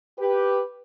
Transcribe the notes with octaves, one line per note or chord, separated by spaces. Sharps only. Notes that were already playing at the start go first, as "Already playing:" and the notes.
G4 B4